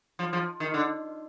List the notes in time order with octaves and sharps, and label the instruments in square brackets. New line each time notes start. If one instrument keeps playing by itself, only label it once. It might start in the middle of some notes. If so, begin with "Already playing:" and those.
[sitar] F3
F3
D#3
D3